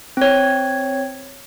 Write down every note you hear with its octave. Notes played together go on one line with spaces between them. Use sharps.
C4 C#5